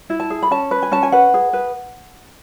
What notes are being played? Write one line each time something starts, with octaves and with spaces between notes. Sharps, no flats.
E4
A5
G#4
B5
C#4 A5
B4
G#5
C#4 A5
G#5
B4 F#5
G#4
B4